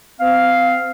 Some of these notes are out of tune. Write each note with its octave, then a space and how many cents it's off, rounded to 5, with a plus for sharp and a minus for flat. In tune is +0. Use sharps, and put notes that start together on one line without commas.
C4 -30 F5 +0